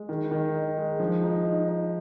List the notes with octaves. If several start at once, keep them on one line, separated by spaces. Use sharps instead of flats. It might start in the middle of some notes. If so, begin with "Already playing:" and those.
Already playing: G#3
D#3
D#3
D#4
G#3
F3
D#4
D#4
D#4